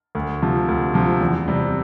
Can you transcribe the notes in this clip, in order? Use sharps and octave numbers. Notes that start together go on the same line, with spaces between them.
D2
C3 F3
D2
C3 F3
E2
C3 G3